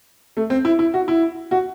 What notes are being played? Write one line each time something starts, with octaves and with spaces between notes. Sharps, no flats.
A3
C4
E4
E4
F#4
E4
F#4